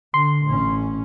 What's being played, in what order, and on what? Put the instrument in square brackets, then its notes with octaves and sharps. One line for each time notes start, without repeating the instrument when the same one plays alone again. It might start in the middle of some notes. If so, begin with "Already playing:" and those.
[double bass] D3 [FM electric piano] C6
[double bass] A1 C#4